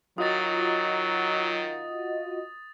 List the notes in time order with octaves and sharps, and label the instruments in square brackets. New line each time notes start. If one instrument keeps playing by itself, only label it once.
[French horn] D#3 [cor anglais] F#3 [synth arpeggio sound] F4 F#4 D#5 [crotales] D#6 A6